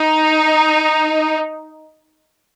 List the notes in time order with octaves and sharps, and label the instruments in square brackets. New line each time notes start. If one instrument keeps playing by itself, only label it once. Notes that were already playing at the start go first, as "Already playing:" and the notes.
Already playing: [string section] D#4